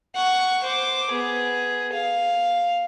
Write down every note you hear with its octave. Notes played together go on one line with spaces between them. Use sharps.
F#5 C#6
C5 D6
B3 G#4
F5